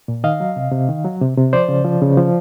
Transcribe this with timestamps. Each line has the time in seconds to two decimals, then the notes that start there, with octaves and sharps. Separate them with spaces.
0.08 A#2
0.24 D#3 D#5 F5
0.40 F#3
0.56 C3
0.72 C3
0.89 D#3
1.05 F#3
1.21 C3
1.37 C3
1.53 F3 C5 D5
1.69 C#3
1.85 F3
2.01 C#3
2.17 F3